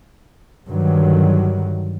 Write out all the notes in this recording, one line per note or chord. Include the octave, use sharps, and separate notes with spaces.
G2 D3 D#3 F#3